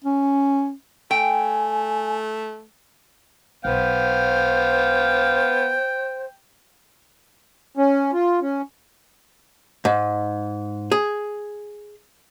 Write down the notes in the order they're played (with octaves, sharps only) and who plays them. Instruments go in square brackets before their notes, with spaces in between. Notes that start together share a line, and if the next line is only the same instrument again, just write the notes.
[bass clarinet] C#4
[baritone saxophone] A3 [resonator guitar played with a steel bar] G5 [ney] G#5
[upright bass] B1 [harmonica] B3 F5 [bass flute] C5 [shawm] G5
[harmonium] C#4
F4
C#4
[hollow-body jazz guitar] G#2
G#4